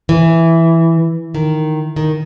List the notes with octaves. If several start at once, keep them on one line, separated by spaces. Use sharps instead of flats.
E3
D#3
D#3